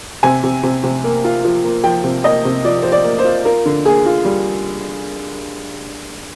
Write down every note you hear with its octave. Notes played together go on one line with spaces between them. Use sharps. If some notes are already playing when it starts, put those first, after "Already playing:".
C3 G#5
C3
C3
C3
A#3
F4
F3
A#3
F3 G5
C3
A#3 D#5
C3
F3 D5
F3 C5
D5
A#3
C5
F4
F4 A#4
D3
A#3 G#4
F4
G3